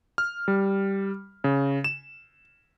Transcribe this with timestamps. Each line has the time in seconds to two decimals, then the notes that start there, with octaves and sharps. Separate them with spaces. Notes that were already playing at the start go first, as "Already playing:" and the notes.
0.18 F6
0.48 G3
1.44 C#3
1.84 E7